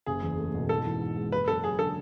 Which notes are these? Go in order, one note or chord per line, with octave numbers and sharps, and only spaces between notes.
F#1 G#4
E2
A3
B2
G#2 A4
E3
G#2
G#3
F#1 B4
F#2 A4
F#3 G#4
D3 A4